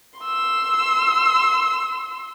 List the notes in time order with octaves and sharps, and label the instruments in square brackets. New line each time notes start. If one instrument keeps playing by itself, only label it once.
[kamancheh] C6 E6